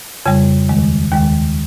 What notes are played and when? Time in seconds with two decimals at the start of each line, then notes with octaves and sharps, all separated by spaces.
0.26 F2 C#3 G3
0.69 D#2 D#3 G#3
1.12 D#2 D#3 G#3 G5